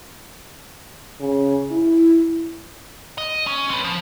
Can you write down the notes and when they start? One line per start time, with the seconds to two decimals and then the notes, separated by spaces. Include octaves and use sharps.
1.20 C#3
1.71 E4
3.18 D#5
3.47 C#4
3.70 C4 B4
3.84 F3